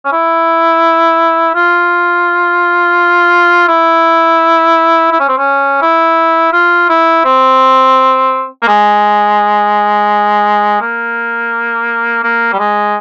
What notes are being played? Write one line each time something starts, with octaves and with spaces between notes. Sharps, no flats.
C#4
E4
F4
E4
E4
C#4
C4
C#4
E4
F4
E4
C4
A#3
G#3
A#3
A#3
G3
G#3